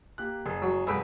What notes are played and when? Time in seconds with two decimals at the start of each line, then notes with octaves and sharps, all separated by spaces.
0.18 A#3 G4 F#6
0.46 F#1 G#4
0.62 F#3
0.87 F1 G2 G#4 B4 G5 E6